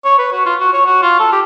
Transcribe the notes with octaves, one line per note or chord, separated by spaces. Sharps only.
C#5
B4
F#4
F4
F#4
C#5
F#4
F4
A4
G4